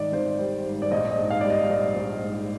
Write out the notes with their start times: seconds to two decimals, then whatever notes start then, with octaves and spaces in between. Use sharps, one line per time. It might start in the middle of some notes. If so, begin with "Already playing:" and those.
Already playing: G#2 D#3 G3 D5 D#5
0.13 G#1 C5
0.39 G3
0.65 G#2
0.82 D5
0.91 A#1 D#5
1.11 D#5
1.18 G#2
1.30 F5
1.41 G3 D5
1.50 D#5
1.70 A#1 D#5
1.96 A#1
2.22 G#2